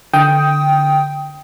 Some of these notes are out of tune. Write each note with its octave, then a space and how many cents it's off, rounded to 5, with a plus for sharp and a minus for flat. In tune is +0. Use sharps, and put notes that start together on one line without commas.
D3 +0 G5 +0 D#6 +15